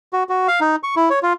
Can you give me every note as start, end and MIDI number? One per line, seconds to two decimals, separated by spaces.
0.13 0.23 66
0.29 0.47 66
0.48 0.60 77
0.61 0.76 63
0.83 0.95 85
0.96 1.09 64
1.10 1.19 73
1.23 1.33 65